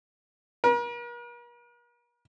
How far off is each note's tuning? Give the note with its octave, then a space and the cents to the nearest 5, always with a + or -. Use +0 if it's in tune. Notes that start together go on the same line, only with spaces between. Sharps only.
A#4 +45